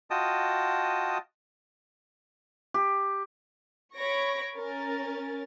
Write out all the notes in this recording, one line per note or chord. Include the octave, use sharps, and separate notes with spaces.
F4 F#4 D#5 G5 A5 D#6
G4
C#5 B5 C#6 A#6 D7
C#4 A#4 A6